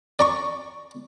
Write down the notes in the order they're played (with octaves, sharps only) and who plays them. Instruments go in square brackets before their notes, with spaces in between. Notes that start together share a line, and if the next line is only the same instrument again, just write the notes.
[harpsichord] D5 A#5 C#6